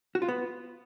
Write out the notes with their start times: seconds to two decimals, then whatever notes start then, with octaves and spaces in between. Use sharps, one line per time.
0.15 F#4
0.22 F4
0.28 B3